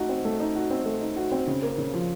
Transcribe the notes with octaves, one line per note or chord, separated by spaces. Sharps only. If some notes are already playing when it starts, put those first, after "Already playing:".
Already playing: A3 D#4 F#4
C4
A3
D#4
F#4
C4
A3
D#4
F#4
C4
C#3
A#3
C#3
F3